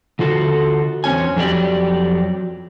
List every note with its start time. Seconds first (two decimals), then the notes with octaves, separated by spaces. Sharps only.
0.19 D3 F4 F#4 A4
1.04 E2 C4 C#4 G#5
1.36 F2 F#3 G4 D5